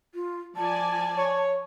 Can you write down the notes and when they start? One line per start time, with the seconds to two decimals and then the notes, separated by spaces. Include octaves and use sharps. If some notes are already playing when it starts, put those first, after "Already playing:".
0.15 F4
0.56 F3 D5 G#5 A5
1.17 C#5